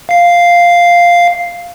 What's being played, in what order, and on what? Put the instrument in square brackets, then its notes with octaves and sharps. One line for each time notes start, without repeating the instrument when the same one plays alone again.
[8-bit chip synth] F5 C7